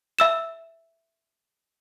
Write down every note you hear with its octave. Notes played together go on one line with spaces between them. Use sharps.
E5 E6 E7